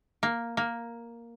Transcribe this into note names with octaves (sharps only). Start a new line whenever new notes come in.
A#3
A#3